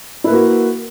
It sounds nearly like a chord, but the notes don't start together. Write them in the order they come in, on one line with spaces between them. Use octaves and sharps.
E4 B4 A#3 F#4